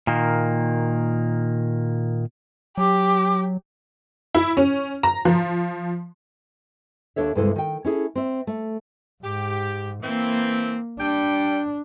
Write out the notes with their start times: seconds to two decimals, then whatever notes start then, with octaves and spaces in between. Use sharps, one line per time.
0.07 A#2 D#3 A#3
2.78 F#3 G4 D6
4.35 E4
4.57 C#4
5.03 A#5
5.25 F3
7.16 D#2 D4 A4 C#5 E5
7.35 D2 G2 C3 G#3 E4 A4
7.56 D#3 G5
7.84 C#4 E4 G#4 A4
8.15 C4 E5
8.47 A3
9.24 G#2 G4
10.03 E3 A#3 C4
10.99 G3 D4 G5